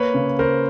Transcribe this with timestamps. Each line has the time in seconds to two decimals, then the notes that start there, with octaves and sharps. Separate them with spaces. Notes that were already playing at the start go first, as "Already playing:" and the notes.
Already playing: A#3 B4 C#5
0.14 C#3
0.39 C#3 A#4 C5